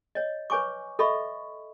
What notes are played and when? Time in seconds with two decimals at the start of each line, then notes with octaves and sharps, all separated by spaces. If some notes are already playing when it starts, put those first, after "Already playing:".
0.15 C#5 D#5
0.50 B4 C#5 G#5 C#6 D6
0.99 A4 D#5 E5 B5 C#6